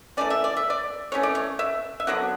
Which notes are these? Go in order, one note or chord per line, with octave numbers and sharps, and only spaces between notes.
E3 A3 C#4 D5
E5
D5
E5
D5
E3 A3 C#4 C#5
D5
C#5
E5
E5
D3 F#3 B3 D4 F#5